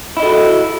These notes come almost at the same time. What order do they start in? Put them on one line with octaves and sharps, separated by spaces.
E4 D#5 A4 F#4